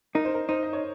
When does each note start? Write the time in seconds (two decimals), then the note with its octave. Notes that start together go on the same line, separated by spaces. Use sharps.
0.15 D#4 A#4
0.25 C5
0.34 A#4
0.48 D#4 C5
0.63 D#5
0.73 C#5